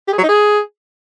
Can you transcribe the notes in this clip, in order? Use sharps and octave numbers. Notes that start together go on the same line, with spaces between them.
G4
G#4
F#3
D#4
G#4